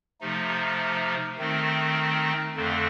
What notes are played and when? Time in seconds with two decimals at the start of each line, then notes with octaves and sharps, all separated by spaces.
0.21 C3 F3 A3 D#4
1.38 D#3 A3 C4 D#4
2.56 F2 D3 A3 C4